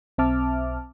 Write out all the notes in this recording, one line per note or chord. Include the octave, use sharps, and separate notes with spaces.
B1 C4 E5 A5 D6 F6